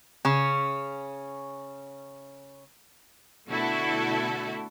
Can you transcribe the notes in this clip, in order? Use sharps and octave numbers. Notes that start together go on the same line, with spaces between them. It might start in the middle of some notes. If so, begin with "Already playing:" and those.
C#3 C#4
B2 D3 A3 E4 F#4 A4